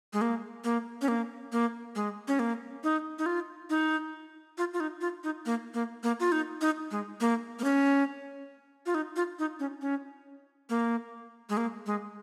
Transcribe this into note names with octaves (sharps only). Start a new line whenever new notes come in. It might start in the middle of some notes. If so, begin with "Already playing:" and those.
G#3
A#3
A#3
C#4
A#3
A#3
G#3
C#4
A#3
D#4
D#4
F4
D#4
F4
F4
D#4
F4
D#4
A#3
A#3
A#3
F4
D#4
D#4
G#3
A#3
A#3
C#4
F4
D#4
F4
D#4
C#4
C#4
A#3
G#3
A#3
G#3